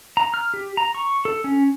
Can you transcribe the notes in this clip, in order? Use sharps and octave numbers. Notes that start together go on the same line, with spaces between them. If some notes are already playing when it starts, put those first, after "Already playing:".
A#5
F6
G4
A#5
C#6
A4
C#4